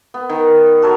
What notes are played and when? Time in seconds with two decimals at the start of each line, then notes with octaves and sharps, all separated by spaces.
0.14 B3
0.29 D#3
0.82 F#4 A4 A#4 C#5